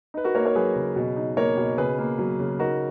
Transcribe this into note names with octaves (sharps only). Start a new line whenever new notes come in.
D#4 B4
F#4 A#4
A#3 A#4 C#5
A#4 C#5
F#3 G#4 B4
C#3
B2
D#4
A#3 A#4 C#5
B2
C#3 G#4 B4
A#3
F#3
C#3
D#4 F#4 A#4